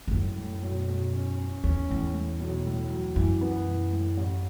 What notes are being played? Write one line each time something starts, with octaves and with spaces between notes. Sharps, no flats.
E2
F#2 A2
A2
B1
B1
C#4
C#4
E2 C#4
E2 A2
A2
B1
A2
F#3
F#2 E3
B3
E3
A2
A1